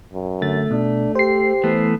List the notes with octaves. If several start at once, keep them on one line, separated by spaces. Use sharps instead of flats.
F#2
D3 A3 A6
B2 D4
G4 C5 C7
E3 A3 B3